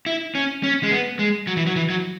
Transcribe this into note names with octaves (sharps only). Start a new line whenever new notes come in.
E4
C#4
C#4
G#3
B3
G#3
F#3
E3
F#3
E3
F#3